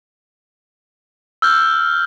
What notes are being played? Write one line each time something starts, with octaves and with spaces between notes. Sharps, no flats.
E6 F6 G6